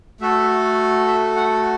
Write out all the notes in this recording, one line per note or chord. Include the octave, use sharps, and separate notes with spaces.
A3 F#4 A4 E5
E5
F#5